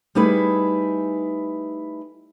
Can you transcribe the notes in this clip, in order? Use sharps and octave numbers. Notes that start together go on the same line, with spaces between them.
G3 A3 D#4 E4 G#4 B4